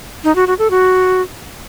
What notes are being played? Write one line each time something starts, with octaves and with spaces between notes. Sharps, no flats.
D#4
F#4
F#4
A4
F#4